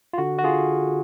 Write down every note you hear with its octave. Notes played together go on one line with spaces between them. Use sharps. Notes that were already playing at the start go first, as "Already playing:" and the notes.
F4
D3 F#4
F#4
D3 F4 G#4